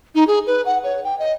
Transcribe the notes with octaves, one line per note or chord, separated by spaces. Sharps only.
D#4
G#4
B4
F#5
C#5
G5
D#5